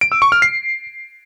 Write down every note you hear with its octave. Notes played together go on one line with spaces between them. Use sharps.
D7
E6
C#6
F6
C7